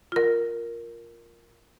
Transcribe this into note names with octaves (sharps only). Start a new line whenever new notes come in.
F4 A#4